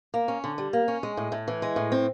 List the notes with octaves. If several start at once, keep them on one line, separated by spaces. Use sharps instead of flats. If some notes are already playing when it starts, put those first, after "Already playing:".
A#3
C#4
D3
G3
A#3
C#4
G#3
A2
A2
E3
G#3
A2
C4